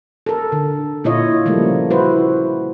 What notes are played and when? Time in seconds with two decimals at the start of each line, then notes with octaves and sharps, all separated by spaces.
0.26 A4 A#4
0.52 D3
1.04 A#2 E4 F4 C#5 D#5
1.46 C#3 F3 G3 A3 A#3
1.90 E4 F#4 B4 C5